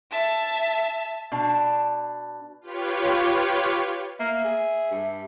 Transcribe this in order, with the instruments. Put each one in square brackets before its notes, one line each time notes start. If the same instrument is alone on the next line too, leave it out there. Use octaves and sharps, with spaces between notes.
[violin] E5 A5
[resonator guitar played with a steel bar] B2 D4
[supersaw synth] F4 G4 B4 C#5
[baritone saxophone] A#3 [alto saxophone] E5
[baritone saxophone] G#4
G2